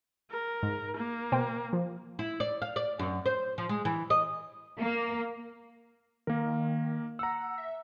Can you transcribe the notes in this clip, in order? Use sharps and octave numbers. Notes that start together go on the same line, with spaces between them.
A#4
G#2
A#3
B2 C5 G5
F3
E4
D5
F5
D5
F#2
C5
F3
G#3
E3
D#5
A#3
D#3 A#3 A#4
F#5 A#5 E6
E5